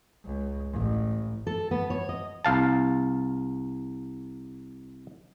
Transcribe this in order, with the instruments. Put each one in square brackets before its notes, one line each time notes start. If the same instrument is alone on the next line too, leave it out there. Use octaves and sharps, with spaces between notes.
[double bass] C#2
A1
[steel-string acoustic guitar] A4
B3
C#5
D#5
[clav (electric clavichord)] C2 F5 A5